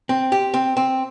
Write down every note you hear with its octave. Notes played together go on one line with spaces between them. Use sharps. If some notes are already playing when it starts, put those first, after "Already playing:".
C4
G4
C4
C4